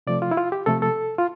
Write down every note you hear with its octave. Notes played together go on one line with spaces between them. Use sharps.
C3 F3 A3 D5
F4
E4
F4
G4
C3 F3 A3 A4
A4
F4